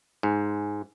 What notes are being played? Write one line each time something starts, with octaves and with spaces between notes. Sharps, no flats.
G#2